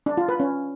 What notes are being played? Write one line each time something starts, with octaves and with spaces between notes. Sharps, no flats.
D4
F4
B4
C#4